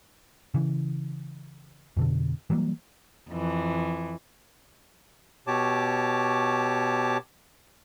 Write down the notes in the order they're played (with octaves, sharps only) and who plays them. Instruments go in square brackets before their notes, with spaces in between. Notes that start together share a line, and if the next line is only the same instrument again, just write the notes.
[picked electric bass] C#3 E3
F2 B2 D3
E3 F#3 G3 A#3
[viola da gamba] F2 E3
[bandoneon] B2 G4 C#5 A5 D6